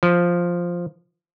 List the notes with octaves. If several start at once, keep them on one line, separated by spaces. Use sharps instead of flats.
F3